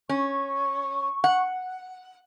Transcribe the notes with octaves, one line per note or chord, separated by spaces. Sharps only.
C#4 C#6
F#5